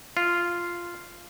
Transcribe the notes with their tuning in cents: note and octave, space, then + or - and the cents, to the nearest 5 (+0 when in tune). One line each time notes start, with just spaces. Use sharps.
F4 -5